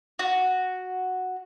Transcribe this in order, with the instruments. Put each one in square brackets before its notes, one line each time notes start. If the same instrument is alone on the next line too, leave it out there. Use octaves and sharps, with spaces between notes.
[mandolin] F#4